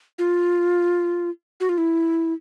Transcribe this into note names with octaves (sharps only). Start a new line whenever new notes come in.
F4
F#4
F4
E4